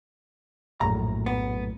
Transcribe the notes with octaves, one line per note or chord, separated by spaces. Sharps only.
A#1 F#2 A2 A#5
B3